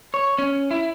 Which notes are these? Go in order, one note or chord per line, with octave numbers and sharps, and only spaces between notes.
C#5
C#4
E4